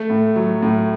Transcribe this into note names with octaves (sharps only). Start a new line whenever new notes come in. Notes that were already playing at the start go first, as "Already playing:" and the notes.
Already playing: A3
A2
F#3
A2